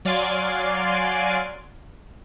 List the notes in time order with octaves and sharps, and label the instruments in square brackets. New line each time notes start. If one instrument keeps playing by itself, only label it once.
[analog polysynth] F#3 D5 F5 G#5 C6 D6